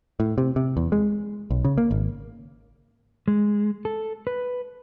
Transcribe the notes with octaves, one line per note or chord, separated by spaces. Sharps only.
A2
C3
C3
E2
G#3
B1
C#3
A#3
G#1
G#3
A4
B4